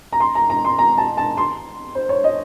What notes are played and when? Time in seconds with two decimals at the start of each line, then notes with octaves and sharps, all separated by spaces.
0.13 A#5
0.20 C6
0.35 A#5
0.50 A#5
0.65 C6
0.79 A#5
0.98 A5
1.17 A5
1.37 C6
1.95 C5
2.09 C#5
2.24 D#5